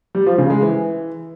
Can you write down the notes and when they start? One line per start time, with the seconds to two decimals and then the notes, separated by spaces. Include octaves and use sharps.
0.15 G3
0.26 F3
0.38 C#3
0.50 G#3
0.62 E3